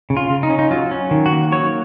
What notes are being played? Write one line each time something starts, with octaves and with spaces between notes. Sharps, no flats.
C#3
F4
C#3
D#4
C#4
D#4
F#3 F4
C#4
D#3
F#4
A#3
F#3 C#5